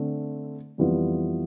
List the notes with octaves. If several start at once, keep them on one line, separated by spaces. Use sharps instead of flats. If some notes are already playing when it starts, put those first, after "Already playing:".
Already playing: D3 A3 C4
F2 E3 G3 B3 F4